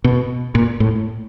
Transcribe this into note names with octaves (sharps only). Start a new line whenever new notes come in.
B2
A#2
A2